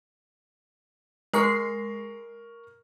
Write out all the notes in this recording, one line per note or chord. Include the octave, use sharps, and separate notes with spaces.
G#3 A#4 C#6 C7